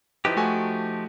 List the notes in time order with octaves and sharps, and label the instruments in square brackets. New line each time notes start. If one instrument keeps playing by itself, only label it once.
[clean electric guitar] F3 D#4 G4 [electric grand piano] E4 B4
[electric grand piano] A3 F#4 G#5